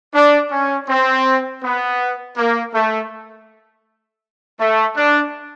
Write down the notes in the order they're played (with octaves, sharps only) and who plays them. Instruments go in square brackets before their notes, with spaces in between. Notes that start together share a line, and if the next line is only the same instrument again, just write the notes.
[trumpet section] D4
C#4
C4
B3
A#3
A3
A3
D4